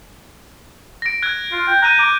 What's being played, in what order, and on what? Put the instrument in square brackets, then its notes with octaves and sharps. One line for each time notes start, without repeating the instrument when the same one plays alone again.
[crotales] A#6 D7
F#6 G#6
[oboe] F4
G5
[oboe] A#5 [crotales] F#6 G6 D#7
[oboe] D6